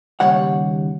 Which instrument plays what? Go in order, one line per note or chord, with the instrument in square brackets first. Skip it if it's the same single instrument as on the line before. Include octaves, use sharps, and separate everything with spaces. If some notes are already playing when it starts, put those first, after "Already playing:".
[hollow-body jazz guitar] D#2 C#3 G3 C#5 F#5